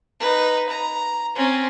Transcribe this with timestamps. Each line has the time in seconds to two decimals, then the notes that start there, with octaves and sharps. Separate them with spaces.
0.20 D#4 B4
0.69 A#5
1.35 C4 C#4